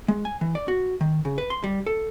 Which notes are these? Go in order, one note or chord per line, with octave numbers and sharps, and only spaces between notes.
G#3
G#5
E3
D5
F#4
D#3
C#3
B4
C6
G3
A4